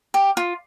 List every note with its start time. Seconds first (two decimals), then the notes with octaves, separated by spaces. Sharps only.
0.14 G4
0.37 F4